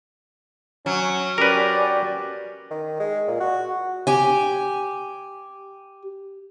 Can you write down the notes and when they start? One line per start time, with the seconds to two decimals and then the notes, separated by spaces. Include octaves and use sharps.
0.86 F#3 C#4
1.38 C#4 G4 A#4 B4 D5
2.71 D#3
3.00 G#3
3.28 A#2
3.40 F#4
4.07 G4 G#5